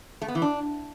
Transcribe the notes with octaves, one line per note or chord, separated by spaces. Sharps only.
A3
B3
E3
D4